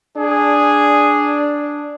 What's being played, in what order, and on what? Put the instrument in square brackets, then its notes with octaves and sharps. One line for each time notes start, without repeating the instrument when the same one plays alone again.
[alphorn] D4 [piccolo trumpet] G#4